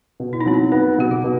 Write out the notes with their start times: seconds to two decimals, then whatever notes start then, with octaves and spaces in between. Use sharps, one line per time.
0.20 B2
0.33 E4
0.41 D#4
0.46 F#3 C4
0.54 D#4
0.72 B3 D#4
0.98 B2 G4
1.11 F#4
1.24 B2